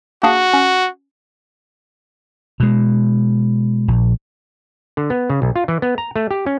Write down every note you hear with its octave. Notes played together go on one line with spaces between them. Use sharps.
A#3 D4 F#4 G#4
C#4
B2 G#3
A#1
D3
B3
C#3
B1
F4
E3
B3
A#5
A3
G4
C#4